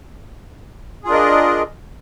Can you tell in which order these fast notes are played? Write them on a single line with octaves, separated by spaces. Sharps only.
G#4 F4 D4 A#4 D#5